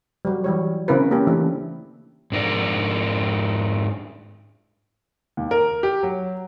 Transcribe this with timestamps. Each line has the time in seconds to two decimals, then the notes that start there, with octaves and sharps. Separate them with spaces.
0.25 F#3 G3
0.44 E3 G3 C#5
0.88 C#3 C4 E4 A#4 B4
1.11 A#3 C#4 G4
1.27 E3 A3 D4
2.32 G#2 D4 A#4 D5
5.37 D#2
5.51 A#4
5.83 G4
6.03 F#3